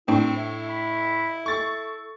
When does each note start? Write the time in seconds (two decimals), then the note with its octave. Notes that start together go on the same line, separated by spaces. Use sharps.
0.08 A2 A3 C4 D4 E4 G5
0.37 E4 E5
0.69 B5
1.46 A4 C#6 A6